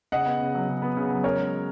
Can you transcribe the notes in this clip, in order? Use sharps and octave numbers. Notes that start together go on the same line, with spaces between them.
C#3 D#5 F#5
B3
C#3
F#3
C#3
B3
C#3
F#3
C#4 A#4 C#5
G#3